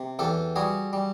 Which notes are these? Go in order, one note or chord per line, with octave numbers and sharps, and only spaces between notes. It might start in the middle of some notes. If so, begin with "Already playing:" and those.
Already playing: C3
E2 G4 A4
G3 F#4 G#4
G3